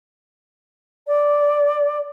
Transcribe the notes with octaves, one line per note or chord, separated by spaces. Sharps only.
D5